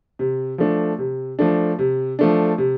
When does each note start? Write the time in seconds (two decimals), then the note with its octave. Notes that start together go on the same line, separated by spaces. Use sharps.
0.19 C3
0.58 F3 A3 D4
0.98 C3
1.39 F3 A3 D4
1.79 C3
2.19 F3 A3 D4
2.58 C3